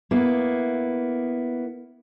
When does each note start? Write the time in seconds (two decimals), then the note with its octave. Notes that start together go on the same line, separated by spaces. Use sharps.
0.11 A#3 B3 E4